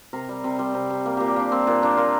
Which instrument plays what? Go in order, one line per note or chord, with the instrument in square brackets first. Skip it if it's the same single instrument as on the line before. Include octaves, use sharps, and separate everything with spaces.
[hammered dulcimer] C3 A#4
G3
C3
G3 C5
C3
C3
A#3 A#4
A#2 G4
G4
A#3 D4
A#2 C4
A#2 D4
A#3 D4
A#3 F4